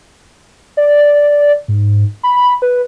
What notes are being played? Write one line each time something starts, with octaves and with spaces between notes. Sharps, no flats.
D5
G#2
B5
B4